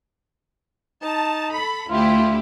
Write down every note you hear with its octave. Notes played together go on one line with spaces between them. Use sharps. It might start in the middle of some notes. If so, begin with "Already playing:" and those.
D#4 A5
A4 B5
D2 E4 F4 G4